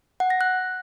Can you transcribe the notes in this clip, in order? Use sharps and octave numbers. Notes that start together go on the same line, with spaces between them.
F#5
A#6
F#6